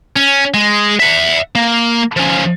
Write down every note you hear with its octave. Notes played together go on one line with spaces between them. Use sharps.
C#4
G#3
E5 F#5
A#3
F3 C#4